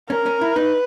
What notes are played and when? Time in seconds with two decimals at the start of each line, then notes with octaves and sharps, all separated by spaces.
0.10 C#4 A#4
0.26 C#4
0.41 E4
0.56 D#4 B4